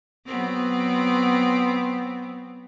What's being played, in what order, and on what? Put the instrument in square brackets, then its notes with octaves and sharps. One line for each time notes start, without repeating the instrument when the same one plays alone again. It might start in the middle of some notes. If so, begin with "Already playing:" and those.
[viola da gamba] F#3 B3 C4